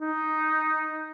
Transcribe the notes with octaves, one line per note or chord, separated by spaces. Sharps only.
D#4